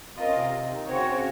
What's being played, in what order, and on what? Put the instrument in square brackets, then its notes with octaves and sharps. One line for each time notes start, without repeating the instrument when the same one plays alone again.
[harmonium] C4 [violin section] F4 A#4 D#5
[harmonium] C#4
C3 C4
C3 C4
D#3 D#4
[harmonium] C#3 C#4 [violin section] C4 F#4 C#5
[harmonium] C#3 C#4